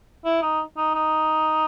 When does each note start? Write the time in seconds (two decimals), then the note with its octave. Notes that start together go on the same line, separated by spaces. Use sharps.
0.25 E4
0.42 D#4
0.77 D#4
0.95 D#4